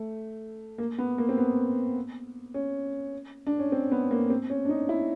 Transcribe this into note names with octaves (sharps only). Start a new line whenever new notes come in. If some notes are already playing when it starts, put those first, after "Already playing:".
Already playing: A3
A#3
B3
A#3
C4
B3
C#4
D4
C#4
C4
B3
A#3
C4
C#4
D4
D#4
E4